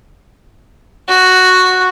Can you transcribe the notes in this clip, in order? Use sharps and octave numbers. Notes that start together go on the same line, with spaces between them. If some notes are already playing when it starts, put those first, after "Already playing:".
F#4